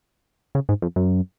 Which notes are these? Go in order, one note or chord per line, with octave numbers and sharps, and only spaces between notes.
C#3
G#2
F2
F#2